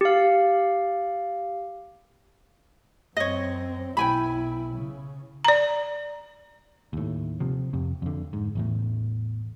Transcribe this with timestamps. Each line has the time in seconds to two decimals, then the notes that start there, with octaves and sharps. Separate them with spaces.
0.01 G4 F5
3.17 F#2 C4 C#5 D#5
3.97 B1 E4 G5 G#5 B5
4.75 C#3
5.45 D5 A#5
6.93 D#2 A2
7.40 C3 F3
7.73 F2 C3
8.02 F2 D3
8.33 G#2
8.55 A1 E2 A2